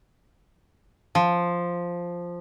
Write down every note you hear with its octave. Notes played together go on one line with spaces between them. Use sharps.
F3